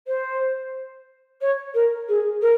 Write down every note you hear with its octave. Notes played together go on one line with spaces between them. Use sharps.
C5
C#5
A#4
G#4
A#4